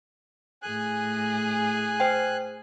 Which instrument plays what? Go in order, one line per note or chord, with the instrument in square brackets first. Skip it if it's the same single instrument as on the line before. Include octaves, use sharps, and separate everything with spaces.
[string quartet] A2 G#4 [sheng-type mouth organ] G#5 F#6
[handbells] C5 G5